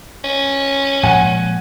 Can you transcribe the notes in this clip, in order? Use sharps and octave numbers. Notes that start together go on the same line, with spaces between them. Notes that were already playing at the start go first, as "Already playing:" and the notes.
C#4
A#2 F3 G#3 F#5 G#5 D#7